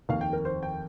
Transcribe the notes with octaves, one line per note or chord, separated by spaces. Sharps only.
F1 D#2 D#3 A#3 F5
G5
A#4
C5
G5